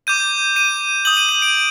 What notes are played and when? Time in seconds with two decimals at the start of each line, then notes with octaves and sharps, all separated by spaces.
0.07 D6 G6 D#7
0.56 D#7
1.05 D#6 G6 F#7
1.17 D#7
1.29 D#7
1.42 D7